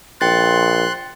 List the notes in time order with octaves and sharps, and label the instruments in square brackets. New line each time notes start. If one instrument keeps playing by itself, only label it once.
[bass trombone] A#1 [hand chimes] G5 A6 [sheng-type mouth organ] C6 F#6